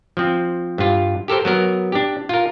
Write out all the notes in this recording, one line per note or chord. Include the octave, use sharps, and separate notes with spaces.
F3 C4
G2 F4
G4 A4 A#4 C5
F#3 B3 A#4
D4 G4
F4 A#4